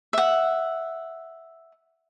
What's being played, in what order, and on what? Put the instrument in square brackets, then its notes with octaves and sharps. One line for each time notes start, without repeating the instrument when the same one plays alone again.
[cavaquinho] E5 F#5